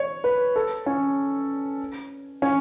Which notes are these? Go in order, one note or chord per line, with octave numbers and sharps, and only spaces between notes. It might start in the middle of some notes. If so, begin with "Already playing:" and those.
Already playing: C#5
B4
A4
C#4
C#4